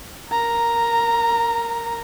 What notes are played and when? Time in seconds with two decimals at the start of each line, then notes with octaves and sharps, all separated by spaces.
0.30 A#4 A#5